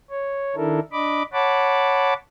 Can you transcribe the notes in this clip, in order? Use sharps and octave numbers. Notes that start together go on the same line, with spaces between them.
C#5
D#3 D4 E4 A4 A#4
D4 D#5 B5 D6
C#5 F#5 A5 B5 D6